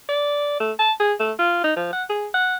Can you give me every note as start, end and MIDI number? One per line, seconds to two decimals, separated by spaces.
0.09 0.57 74
0.60 0.72 57
0.79 0.92 81
1.00 1.14 68
1.20 1.32 57
1.39 1.62 65
1.64 1.75 63
1.77 1.89 53
1.93 2.04 78
2.09 2.27 68
2.34 2.56 78